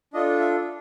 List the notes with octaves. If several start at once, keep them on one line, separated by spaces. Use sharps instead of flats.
D4 F4 A4 D#5
E5